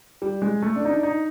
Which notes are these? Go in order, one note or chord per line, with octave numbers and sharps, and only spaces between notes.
G3
G#3
A3
D4
D#4
D4
D#4